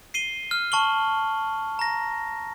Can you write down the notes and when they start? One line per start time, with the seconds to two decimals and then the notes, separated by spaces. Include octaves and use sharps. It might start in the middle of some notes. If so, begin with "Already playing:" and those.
0.14 C7 D#7 G7
0.51 F6
0.72 A5 C#6 F#7 G7
1.79 A#5 A#6